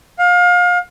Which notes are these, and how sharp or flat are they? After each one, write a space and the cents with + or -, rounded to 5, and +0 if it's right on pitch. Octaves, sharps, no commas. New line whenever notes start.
F5 +30